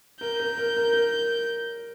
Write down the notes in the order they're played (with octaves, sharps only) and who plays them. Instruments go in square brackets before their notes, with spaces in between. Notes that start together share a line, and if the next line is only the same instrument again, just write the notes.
[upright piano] A#4 [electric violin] G6
[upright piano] A#4
A#4
A#4
A#4